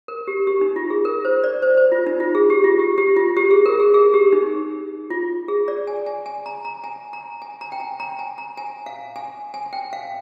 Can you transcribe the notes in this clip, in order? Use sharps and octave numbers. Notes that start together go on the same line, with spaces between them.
A#4
G4
G4
D#4
F4
G#4
A#4
C5
D5
C5
C5
F4
D#4
F4
G#4
G4
F4
G4
G4
F4
G4
G#4
A#4
G#4
G#4
G4
D#4
F4
G#4
D5
G#5
G#5
G#5
A#5
A#5
G#5
A#5
G#5
A#5
G5
G#5
A#5
G#5
A#5
G#5
F5
G#5
G#5
G5
F5